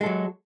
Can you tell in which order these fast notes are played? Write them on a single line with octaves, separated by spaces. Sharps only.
G#3 A4 F#3